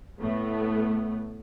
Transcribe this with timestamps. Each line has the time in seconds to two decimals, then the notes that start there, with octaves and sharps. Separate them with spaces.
0.21 A2 A3 B3